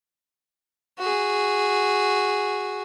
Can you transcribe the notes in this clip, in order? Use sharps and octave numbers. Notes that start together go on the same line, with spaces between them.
F#4 G#4